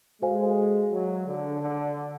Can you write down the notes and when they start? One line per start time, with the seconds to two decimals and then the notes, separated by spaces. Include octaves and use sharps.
0.22 G#3 F#4 A4 C5 F5 G#5
0.91 F#3
1.26 D3
1.60 D3